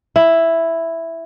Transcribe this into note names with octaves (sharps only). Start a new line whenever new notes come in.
E4